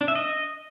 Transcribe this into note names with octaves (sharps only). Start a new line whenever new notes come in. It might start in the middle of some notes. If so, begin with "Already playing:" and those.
D4
E5
D#5